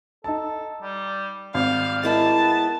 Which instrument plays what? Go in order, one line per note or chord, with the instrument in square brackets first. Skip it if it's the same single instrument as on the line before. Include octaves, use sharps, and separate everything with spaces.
[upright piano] D#4 A5 [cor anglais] A4
[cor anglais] G3
[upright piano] G#1 [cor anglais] G3 [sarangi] F5
[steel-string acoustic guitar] G#3 E4 A#4 [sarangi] A5
[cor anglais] B3